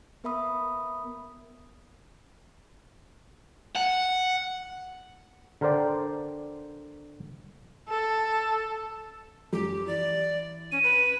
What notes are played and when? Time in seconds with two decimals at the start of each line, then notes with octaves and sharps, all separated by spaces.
0.24 B3 A#4 E5 B5 D#6
3.75 F#5
5.61 D3 A#4 C5 D5 G5
7.89 A4
9.53 F#2 G4
9.87 E3 D5
10.72 C#4 D#7
10.83 B4